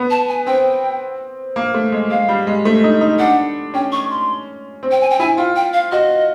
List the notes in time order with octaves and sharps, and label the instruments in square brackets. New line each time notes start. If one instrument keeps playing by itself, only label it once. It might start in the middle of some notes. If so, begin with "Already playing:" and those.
Already playing: [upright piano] B3
[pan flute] A5
G#5
[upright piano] C4 [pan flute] G5
[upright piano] A#3
A3
G#3
[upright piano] G#3 [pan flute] F5
[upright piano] G3
G#3
A3
D#4
D#4
[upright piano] D4 [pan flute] F#5
[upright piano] C#4 [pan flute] G5
[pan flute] C#6
C6
[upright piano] C4
[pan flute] G5
G#5
G5
[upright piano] E4 [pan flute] G#5
[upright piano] F4 [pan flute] G5
[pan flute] G5
F5
[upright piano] F#4 [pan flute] D#5